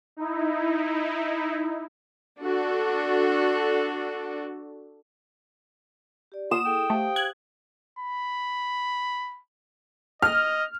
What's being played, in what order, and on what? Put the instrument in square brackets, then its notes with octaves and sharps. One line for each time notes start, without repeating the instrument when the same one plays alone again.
[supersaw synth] D#4 E4
[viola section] D4 F#4 A4
[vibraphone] G4 D5
[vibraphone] A#3 F#5 [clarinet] F4 [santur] D#6 [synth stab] E7
[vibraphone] E4 G#4 A4 [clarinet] G5
[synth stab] A3 [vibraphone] G4 C5 F5
[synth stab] F#6 G#6
[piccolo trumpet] B5
[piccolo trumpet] D#5 [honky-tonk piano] F6